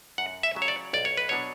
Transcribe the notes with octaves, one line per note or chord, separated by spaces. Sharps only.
F#2 F#5
E5
C#3 F#3
C#5
D5
B1 D5
C#5
B4
B2 F#3 B3 D4 C#5